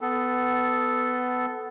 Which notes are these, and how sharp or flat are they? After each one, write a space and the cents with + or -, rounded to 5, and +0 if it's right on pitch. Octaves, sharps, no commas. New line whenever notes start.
B3 +15 A4 -5